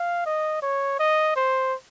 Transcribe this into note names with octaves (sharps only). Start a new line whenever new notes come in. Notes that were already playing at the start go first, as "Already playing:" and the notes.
Already playing: F5
D#5
C#5
D#5
C5